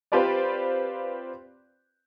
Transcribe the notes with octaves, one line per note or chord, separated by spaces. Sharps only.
C4 F4 G4 B4 C5 D5